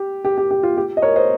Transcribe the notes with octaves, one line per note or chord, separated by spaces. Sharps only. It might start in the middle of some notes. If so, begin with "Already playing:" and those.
Already playing: G4
G4
G4
G4
F4
G4
D#5
A#4 C#5
C5 D#5